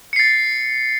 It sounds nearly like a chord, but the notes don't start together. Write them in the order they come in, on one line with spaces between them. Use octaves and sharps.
C#7 C7 A6